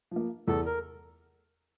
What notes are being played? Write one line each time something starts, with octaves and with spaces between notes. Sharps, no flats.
F3 A#3
E2 A4
A#4